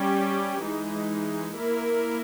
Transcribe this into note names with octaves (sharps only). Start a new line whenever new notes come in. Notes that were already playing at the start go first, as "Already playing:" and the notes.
Already playing: G3 C#4 G4
E3 G#3 D#4
A#3 E4 A#4